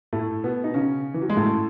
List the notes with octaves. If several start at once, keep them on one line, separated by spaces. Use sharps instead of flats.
A2 A3
B2 B3
D#4
C#3 C#4
E3
F#3
G#3
A2 A3